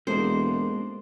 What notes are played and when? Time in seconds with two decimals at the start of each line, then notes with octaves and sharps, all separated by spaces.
0.07 E1 G#3 A#3 C#4 D4 A4 A#4 C5